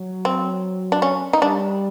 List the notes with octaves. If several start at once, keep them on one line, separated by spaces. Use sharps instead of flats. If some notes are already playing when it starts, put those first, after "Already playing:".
Already playing: F#3
C4
D4
C#4
D#4
G3 D4